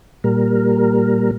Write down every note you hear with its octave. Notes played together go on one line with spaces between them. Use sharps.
A#2 G3 A#4